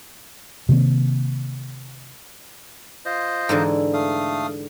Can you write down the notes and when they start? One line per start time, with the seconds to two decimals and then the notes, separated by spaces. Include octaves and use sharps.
0.69 C3 D#3 A#3 C4
3.05 F4 C5 D#5
3.49 G#2 D3 E3
3.94 A3 F5 D#6